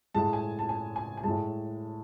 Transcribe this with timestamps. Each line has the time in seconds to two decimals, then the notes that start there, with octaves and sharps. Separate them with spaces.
0.15 A2 G#3 A5
0.33 G#5
0.59 A5
0.69 G#5
0.96 G#5
1.17 G#5
1.23 A2 G#3 A5